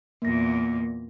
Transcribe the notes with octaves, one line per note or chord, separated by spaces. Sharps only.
E2 A#2 A#3 A#6